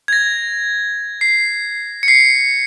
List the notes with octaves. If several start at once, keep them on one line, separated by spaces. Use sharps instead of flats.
G#6
A#6
C7
C#7
C7